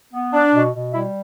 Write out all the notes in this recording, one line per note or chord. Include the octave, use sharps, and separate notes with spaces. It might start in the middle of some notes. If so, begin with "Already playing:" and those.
B3
D4
B2
B2
G3 E4 E5